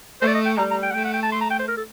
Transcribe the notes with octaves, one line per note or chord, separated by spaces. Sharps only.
A3 C5
D5
D#5
G5
G3 A#5
A#5
G5
F#5
A3 G5
F#5
G5
A5
C6
A#5
G5
C5
A#4
A4